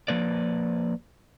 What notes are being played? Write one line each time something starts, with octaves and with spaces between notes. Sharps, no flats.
F3 A#3 B4 D5